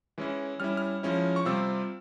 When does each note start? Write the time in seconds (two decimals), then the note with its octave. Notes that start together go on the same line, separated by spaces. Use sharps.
0.18 E3 G#3 C#4 E4
0.60 G3 C#4 E4 F6
0.77 F6
1.03 F3 G#3 C#4 E4
1.36 C#6
1.45 C3 G3 C4 F4 E6